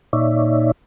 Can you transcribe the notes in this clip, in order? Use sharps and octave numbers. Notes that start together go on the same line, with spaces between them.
A#2 D#4 C#5 D5 E5